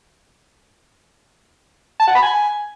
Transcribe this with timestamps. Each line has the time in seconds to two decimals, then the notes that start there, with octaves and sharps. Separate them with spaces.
2.00 A5
2.07 F#5
2.15 B5
2.23 G#5